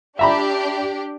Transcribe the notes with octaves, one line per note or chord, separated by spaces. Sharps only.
D4 G4 E5 A#5 B5